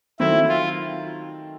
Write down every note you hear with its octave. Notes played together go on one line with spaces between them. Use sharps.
D#3 F#3 A3 C4 E4
F4